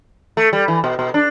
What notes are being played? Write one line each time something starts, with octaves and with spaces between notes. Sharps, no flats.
A3
G3
E3
B2
B2
D4